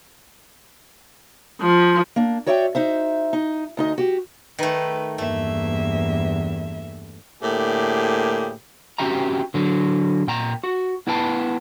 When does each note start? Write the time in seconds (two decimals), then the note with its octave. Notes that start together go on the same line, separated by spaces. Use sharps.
1.61 F3
2.16 A#3 D4
2.46 F#4 C#5 D5 E5 F#5 G5
2.75 D#4 C5 E5
3.33 D#4
3.77 D2 D#4 D#5
3.98 F#4 G4
4.59 D#3 A3 B4
5.18 E2 G2 A3 A#3 E5
7.42 A2 D3 A#3 G4 G#4
8.98 C4 C#4 F#4 G4 E5 A#5
9.54 D3 F#3
10.27 A#2 G5 A#5
10.64 F#4
11.07 B3 E4 B4 G5 A5